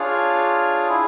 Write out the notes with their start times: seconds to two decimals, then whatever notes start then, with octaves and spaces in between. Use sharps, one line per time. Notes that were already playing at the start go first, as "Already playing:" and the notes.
Already playing: D4 F4 G#4 C#5 F5
0.89 E4 G#4